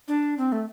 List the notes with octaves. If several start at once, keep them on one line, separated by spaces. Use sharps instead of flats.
D4
C4
A3